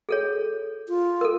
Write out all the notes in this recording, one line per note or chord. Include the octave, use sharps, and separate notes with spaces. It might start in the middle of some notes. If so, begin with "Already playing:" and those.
G#4 A4 C#5
F4
A4 A#4